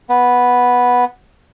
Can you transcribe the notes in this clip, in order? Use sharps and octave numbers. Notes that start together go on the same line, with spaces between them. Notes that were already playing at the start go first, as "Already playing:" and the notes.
B3